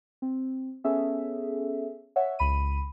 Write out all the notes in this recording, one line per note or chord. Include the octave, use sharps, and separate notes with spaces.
C4
B3 C#4 G#4 A4 E5
C#5 E5 F#5
C#2 B5 D#7